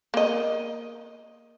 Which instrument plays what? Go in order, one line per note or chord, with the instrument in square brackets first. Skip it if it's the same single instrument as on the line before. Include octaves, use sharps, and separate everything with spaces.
[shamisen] A#3 D#5